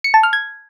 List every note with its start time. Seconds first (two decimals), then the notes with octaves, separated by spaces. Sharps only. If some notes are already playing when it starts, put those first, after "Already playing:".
0.04 C#7
0.14 A5
0.23 F6
0.33 G#6